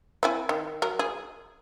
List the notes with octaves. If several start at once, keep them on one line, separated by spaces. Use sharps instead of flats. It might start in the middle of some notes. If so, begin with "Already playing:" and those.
C4 E4 G#5
D#3
F#3 A#4
G#4